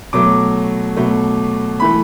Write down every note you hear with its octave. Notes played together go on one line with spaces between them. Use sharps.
B2 F#3 A3 D6
B2 F#3 A3
E3 A3 B5